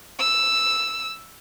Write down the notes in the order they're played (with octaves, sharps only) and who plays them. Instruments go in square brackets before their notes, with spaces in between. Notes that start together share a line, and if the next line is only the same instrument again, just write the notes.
[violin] E6